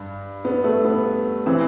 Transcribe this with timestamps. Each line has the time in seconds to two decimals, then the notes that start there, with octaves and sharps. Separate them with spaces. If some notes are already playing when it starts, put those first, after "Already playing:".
Already playing: G2
0.45 B3
0.64 A3
0.85 B3
1.46 E3 C4